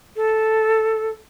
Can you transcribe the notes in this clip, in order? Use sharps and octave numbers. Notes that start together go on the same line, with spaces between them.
A4